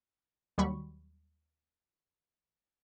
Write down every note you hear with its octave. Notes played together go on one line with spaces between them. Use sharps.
D#2 F#3 G3 B5 C#6